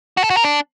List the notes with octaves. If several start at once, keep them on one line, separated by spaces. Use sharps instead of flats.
F#4
A4
F#4
A#4
D4